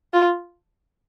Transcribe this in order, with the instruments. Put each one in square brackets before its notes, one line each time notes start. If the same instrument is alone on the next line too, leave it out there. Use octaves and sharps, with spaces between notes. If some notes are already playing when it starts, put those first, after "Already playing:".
[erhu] F4